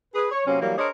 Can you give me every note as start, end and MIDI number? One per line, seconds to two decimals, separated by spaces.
0.15 0.27 68
0.15 0.27 71
0.32 0.42 73
0.47 0.59 48
0.47 0.59 54
0.47 0.59 58
0.47 0.59 60
0.47 0.59 61
0.61 0.73 52
0.61 0.73 54
0.61 0.73 55
0.61 0.73 58
0.78 0.89 62
0.78 0.89 68
0.78 0.89 70
0.78 0.89 72
0.78 0.89 73
0.78 0.89 75